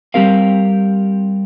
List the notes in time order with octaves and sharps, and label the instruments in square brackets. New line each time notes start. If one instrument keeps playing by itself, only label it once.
[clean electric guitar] G3 C4 G4 A#4 F5